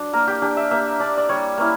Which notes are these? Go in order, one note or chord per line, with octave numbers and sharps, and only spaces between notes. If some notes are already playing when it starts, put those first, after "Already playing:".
Already playing: F#3 D4
A#3 A#4
G4
D4 G4
E5
A#3 E5
D4 D5
D5
G3 C#5
A#3 C#4 E4